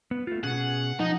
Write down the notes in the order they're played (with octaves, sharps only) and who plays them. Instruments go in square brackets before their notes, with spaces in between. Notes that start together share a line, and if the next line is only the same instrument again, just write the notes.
[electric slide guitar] B3
A3 F4
[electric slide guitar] B2 C#4 G#4 [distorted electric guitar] F#5
[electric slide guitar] F3 [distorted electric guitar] D#4